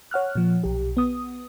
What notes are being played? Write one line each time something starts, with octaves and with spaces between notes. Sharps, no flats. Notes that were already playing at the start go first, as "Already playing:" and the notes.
C#5 F#5 F6 F#6
A#2 F3
B1 G4
B3 D#6